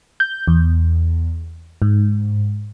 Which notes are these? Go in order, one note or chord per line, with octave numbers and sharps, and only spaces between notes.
G6
E2
G#2